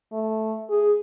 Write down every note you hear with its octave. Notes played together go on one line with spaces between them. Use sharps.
A3
G#4